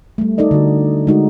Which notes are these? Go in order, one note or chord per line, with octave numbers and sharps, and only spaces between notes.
G3 A3
D#4 A4 D5 D#5
D3 F#4
G#3 D#4 F#4